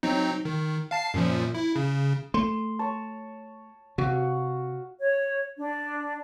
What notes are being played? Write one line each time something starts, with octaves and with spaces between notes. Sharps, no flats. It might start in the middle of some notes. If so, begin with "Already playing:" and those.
F#3 C4 D#4
D#3
F5 A5 C7
F#2 A#2 F3
E4
C#3
A3 C6
C#5 A5 C#6
C3 F#4 F5
C#5
D4